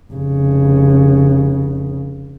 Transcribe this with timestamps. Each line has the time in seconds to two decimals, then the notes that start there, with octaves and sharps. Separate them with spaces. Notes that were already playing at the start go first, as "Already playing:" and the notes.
0.12 F1 C#3